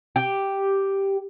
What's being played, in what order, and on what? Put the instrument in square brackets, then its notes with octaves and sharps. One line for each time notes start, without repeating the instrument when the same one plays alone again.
[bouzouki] G4